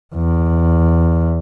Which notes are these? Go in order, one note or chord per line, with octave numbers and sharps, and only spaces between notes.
E2